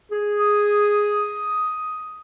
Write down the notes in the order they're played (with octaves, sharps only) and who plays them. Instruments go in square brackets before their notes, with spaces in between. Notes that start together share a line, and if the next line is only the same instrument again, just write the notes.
[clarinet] G#4
[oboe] D#6